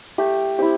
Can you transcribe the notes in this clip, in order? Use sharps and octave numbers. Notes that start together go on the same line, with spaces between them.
A3 G4
C4 E4 G4